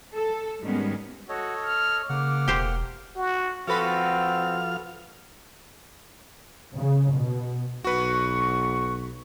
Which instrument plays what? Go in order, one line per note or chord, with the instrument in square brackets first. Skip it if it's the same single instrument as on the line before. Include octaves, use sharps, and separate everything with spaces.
[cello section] A4
G#2 D#3 G3 G#3 B3 C#4
[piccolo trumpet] F#4 [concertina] A4 C#5 D#5
[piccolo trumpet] F6
[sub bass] C#3 [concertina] A#3 F#5 F6 [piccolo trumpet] D6
[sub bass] E1 [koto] G4 C5
[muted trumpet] F#4
[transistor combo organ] F3 F5 F6 [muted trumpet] C4 [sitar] F#4 A4 B4
[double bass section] C#3
B2
[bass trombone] B1 [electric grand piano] F#4 B4 [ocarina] C#6